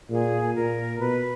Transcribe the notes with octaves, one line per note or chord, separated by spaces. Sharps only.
A#2 G#4
A#2 A#4
B2 B4